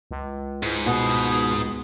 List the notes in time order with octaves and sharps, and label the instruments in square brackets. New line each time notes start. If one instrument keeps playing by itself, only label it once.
[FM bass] C#2
[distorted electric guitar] G#2 [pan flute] E4
[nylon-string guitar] B2 [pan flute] D#6